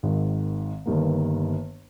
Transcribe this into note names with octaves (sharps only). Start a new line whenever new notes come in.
G#1 G#2 D#3
G1 G2 D#3 A#3